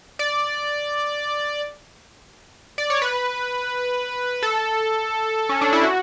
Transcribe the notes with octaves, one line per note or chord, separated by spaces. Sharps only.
D5
D5
C#5
B4
A4
C#4
D4
E4
F#4